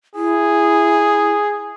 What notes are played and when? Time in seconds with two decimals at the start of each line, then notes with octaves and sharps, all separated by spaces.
0.15 E4 G#4